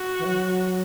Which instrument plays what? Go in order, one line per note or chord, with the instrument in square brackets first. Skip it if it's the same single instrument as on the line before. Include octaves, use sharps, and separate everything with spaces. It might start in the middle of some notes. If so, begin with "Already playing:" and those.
Already playing: [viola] F#4
[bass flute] E3
F#3